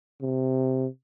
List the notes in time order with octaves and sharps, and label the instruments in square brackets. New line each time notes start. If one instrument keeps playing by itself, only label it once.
[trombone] C3